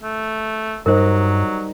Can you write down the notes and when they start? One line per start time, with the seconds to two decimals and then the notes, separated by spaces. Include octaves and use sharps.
0.03 A3
0.86 G2 F#3 G3 D#4 A#4 C5 D#5